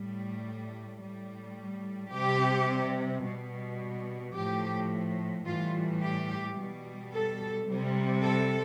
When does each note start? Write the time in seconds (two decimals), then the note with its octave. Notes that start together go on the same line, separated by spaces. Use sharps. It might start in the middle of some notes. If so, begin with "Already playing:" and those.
Already playing: A2 G3
1.01 A2 G3
2.11 C3 G3 G4
3.23 B2 G3
4.35 A2 F3 G4
5.45 A2 E3 G3 F4
6.02 G4
6.57 B2 G3
7.13 A4
7.68 C3 G3
8.24 A4